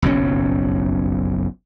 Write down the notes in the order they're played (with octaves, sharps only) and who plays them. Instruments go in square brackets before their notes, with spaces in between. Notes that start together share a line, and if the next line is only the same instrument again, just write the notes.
[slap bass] F#1 B1 F2 C#4